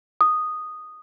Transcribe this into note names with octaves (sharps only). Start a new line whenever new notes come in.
D#6